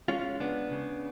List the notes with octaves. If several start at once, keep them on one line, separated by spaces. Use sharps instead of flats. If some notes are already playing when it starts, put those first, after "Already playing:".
G#3 C#4 F4
C#3 B3 D4
C#3